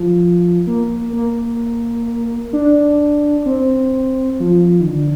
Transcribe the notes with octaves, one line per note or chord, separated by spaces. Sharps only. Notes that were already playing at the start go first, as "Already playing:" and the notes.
Already playing: F3
A#3
A#3
D4
C4
F3
D#3
D3